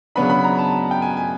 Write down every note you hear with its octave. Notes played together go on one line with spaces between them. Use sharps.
C#3 F#3 B3 D4 B5
B5
A#5
A5
G5
G#5
G#5